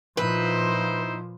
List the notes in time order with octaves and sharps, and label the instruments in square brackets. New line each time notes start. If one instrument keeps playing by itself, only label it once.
[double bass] A#2 F3 [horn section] D#4 E4 C5 [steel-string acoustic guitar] B4